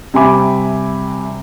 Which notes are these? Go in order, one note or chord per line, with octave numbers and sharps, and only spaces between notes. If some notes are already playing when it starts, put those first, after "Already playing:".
C3 G3 E5 G#5 B5 D6